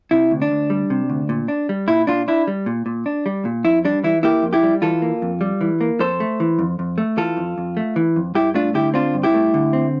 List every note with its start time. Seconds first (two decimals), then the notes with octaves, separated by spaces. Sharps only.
0.11 C3 E4
0.31 D2
0.42 D4
0.51 D2
0.70 G3
0.90 C3
1.10 D2
1.29 A#2
1.48 D4
1.69 G3
1.88 A#2 E4
2.07 A#2 D4 F4
2.28 D4 E4
2.47 G3
2.66 A#2
2.86 A#2
3.06 D4
3.26 G3
3.45 A#2
3.65 F2 E4
3.85 G3 D4
4.04 E3 E4
4.23 A#3 E4 G4
4.43 F2
4.53 E4 G4
4.63 G3
4.82 E3 F4 A4
5.02 A#3
5.22 F2
5.41 G3
5.61 E3
5.81 A#3
6.00 F2 A4 C5
6.20 A3
6.40 E3
6.59 F2
6.79 F2
6.98 A3
7.17 E3 F4 A4
7.37 F2
7.58 F2
7.77 A3
7.96 E3
8.16 F2
8.35 G2 E4 G4
8.54 A3 D4 F4
8.74 D3 E4 G4
8.94 C4 D4 F4
9.14 G2
9.23 E4 G4
9.34 A3
9.54 D3
9.73 C4